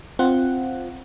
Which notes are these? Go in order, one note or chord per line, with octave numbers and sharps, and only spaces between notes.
C4 F4 F#5